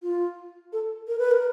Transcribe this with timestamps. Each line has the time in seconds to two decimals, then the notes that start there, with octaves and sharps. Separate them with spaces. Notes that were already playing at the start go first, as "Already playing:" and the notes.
0.02 F4
0.73 A4
1.08 A#4
1.19 B4
1.31 A#4